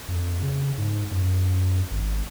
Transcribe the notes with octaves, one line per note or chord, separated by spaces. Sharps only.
F2
C#3
G#2
F#2
G#1